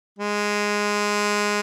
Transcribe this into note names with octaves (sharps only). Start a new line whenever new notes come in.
G#3